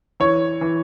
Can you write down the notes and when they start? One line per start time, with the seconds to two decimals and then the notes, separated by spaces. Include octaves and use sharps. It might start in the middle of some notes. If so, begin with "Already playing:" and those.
0.20 E3 C#5
0.61 E3